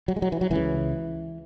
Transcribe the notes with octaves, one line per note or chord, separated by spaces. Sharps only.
F#3
G#3
F#3
E3
F#3
C#2 C#3 E3